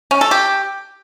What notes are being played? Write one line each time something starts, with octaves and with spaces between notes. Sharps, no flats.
C#4
A4
G4